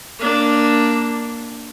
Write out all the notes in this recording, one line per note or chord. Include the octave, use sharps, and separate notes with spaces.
A#3 D4